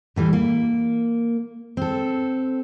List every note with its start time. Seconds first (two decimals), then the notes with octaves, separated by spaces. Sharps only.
0.16 A2 E3 G3
0.33 A#3
1.77 C4 A4